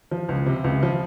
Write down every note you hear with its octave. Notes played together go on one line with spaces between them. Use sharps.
F3
C#2
C3
C#2
F3